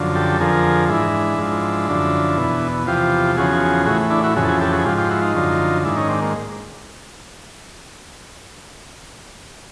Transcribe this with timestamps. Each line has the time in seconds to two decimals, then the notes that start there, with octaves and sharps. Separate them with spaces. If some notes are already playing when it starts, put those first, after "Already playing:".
Already playing: F#2 D3 F3
0.15 G4 A4
0.40 F2 D3 F3 G#4 A#4
0.89 G#2 E3 D4 E4
1.38 G#2 F3
1.89 F#2 D3 F3
2.37 E2 B2
2.87 E2 C3 F3 F4 G4
3.37 E2 C#3 F3 F#4 G#4
3.86 A2 E3 F#4 G#4
4.10 D4 E4
4.24 E4 F#4
4.36 F2 C#3 E3 F#4 G#4
4.44 A4
4.48 F#4 G#4
4.60 G4 A4
4.73 F#4 G#4
4.85 G#2 F3 F4 G4
4.97 F4 G4
5.09 E4 F#4
5.22 D#4 F4
5.34 F#2 D3 F3
5.85 G#2 D#3 D4 E4
5.96 C#4 D#4
6.09 C4 D4
6.22 A#3